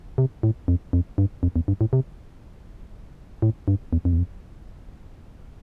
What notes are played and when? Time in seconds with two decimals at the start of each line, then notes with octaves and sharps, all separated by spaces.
0.18 C3
0.43 A2
0.68 F2
0.93 F2
1.18 G2
1.43 F2
1.56 E2
1.68 G2
1.81 A2
1.93 C3
3.42 A2
3.68 G2
3.93 E2
4.05 F2
4.13 E2
4.18 F2